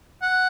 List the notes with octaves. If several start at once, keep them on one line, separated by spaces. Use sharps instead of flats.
F#5